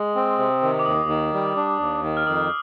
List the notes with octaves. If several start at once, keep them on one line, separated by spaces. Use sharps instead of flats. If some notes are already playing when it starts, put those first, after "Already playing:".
Already playing: G#3 D#6
C4
C3
D#3
D6
D#2 D#6
D#3
G3
D4
D#2
D#3
F6
F2 D#6